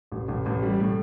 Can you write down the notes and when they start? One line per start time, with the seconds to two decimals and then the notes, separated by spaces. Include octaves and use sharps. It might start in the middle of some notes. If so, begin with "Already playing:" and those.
0.12 A1
0.28 A1
0.46 A1
0.63 G3
0.80 A2